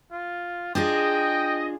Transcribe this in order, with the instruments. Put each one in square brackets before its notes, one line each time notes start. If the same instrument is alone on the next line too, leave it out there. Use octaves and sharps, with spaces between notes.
[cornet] F4
[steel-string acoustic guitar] D4 F4 G#4 [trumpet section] D#5 [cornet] G5